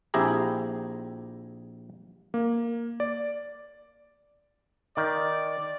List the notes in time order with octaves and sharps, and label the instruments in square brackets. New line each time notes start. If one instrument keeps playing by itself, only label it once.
[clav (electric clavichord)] A#1 C4 E4 G4 G#4 A#5
[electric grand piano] A#3
D5
[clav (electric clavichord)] D#3 [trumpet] D5